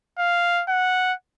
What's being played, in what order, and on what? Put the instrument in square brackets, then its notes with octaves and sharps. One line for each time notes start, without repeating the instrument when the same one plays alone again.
[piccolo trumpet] F5
F#5